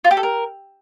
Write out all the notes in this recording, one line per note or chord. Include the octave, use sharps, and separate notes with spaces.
F4
G4
A4
A#4